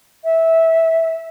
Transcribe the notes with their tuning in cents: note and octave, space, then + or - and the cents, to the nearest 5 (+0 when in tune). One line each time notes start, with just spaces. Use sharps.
E5 -15